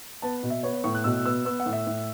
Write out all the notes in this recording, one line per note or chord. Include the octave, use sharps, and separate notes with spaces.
B3 A5
B2
E5
B3 C#5
C#5
A2 C#6
F#6
B2 E6
B3 E6
B3 E6
F#5
A2
E5
A2